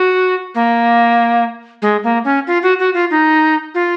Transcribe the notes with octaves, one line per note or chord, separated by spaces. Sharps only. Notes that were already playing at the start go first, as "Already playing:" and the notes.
Already playing: F#4
A#3
G#3
A#3
C#4
F4
F#4
F#4
F4
D#4
F4